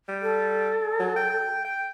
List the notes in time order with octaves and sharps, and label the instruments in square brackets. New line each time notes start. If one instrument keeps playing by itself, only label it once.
[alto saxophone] G3
[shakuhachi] A4
[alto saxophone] F#3
G5
G5